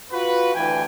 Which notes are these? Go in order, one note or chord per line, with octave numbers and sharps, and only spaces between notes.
F4 F#4 B4
D2 E3 E4 G5 G#5